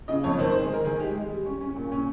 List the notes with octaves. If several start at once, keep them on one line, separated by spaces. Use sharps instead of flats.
C#3 D#5
F2 C#5
D#3 C5
C5
G#3
G#4
D#4 A#4
D#3 G#4
G#3 G4
G#3
G3
C#4
C#4
A#2
C#4